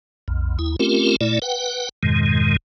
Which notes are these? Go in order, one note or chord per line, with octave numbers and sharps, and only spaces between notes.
B1 F2
D#2 E4
A3 C4 C#4 F4 G4 A#4
A#2 A3 E4 D5
B4 F#5 G5
F2 G#2 B2 D#3 G#3